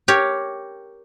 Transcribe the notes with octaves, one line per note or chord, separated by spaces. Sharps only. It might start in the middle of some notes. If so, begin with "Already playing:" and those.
G4 A#4 C#5